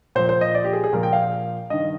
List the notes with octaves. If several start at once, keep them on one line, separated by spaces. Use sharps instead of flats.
A#2 F3 C5
C5
D#5
D5
G4
G#4
G#4
A#2 F3 A#4
G5
F5
G2 D#3 D#5